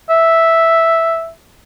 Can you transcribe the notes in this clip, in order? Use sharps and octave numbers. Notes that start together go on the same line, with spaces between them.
E5